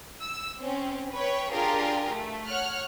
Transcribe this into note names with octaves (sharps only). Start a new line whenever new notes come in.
E6
C4 C#4
B4 C#5 G5
D4 F4 G4 G#4 A#4
A3
C#5 F#5 F6 F#6